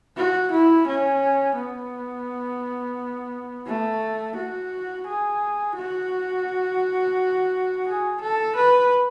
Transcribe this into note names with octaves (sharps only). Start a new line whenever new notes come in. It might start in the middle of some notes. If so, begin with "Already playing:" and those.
F#4
E4
C#4
B3
A3
F#4
G#4
F#4
G#4
A4
B4